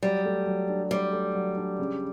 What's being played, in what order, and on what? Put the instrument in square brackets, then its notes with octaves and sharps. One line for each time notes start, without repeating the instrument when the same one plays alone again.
[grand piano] F#3 [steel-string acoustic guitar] G3
[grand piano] A3
F#3
D4
[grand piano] F#3 [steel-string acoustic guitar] G3
[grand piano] A3
F#3
D4
C#3